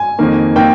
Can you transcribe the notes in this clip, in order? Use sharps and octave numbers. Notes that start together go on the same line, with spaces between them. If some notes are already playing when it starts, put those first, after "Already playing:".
Already playing: G#5
F2 D#3 A#3
D#3 A#3 G5